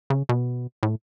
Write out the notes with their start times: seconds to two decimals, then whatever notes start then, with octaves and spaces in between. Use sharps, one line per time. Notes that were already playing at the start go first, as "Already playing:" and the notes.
0.10 C#3
0.29 B2
0.83 A2